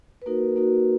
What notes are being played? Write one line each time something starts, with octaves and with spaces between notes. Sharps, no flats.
B4
A#3 D#4 F#4 A#4
A#3 D#4 F#4